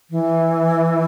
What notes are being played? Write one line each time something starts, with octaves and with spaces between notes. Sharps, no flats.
E3